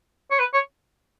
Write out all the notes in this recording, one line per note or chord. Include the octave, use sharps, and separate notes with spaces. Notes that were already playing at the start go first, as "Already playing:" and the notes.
C#5
B4
C#5